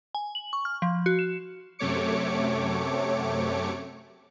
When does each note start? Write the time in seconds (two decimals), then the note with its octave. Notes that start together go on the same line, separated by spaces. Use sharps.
0.15 G#5
0.35 F#7
0.53 C#6
0.65 F6
0.82 F3
1.06 F#4
1.19 E7
1.79 F#2 C3 A3 C#5 D6 C#7